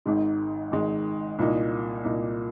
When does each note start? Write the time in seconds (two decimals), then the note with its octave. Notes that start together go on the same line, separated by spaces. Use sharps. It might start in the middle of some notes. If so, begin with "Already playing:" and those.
0.06 G#1 G#2 D#3 G#3
0.72 G#1 G#2 D#3 G#3
1.39 C2 A#2 A#3 D#4
2.05 C2 A#2 A#3 D#4